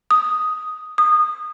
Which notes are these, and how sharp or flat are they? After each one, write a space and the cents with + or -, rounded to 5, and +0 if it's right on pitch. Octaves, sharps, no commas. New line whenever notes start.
D#6 +5
D#6 -20